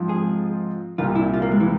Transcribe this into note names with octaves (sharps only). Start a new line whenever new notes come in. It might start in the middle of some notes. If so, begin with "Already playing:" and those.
Already playing: G#2 F3 C4 F4
G#4
C2 A#2 G3 F4
E4
F4
A#3
G#3
E3